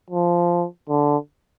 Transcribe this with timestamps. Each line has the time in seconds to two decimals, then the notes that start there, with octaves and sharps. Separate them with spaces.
0.10 F3
0.89 D3